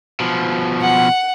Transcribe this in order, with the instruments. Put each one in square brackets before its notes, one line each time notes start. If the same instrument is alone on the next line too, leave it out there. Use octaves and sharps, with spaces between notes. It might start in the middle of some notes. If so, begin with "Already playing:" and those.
[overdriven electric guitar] B2 F3
[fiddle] F#5